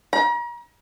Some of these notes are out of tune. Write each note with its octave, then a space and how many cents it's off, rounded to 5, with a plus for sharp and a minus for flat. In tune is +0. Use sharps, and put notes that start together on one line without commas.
A#5 +40